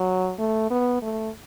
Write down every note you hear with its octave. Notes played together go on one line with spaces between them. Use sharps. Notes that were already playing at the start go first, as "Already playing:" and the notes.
Already playing: F#3
A3
B3
A3